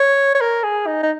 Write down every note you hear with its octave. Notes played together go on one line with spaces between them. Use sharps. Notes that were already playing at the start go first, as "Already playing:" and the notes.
Already playing: C#5
C#5
A#4
G#4
D#4
D#4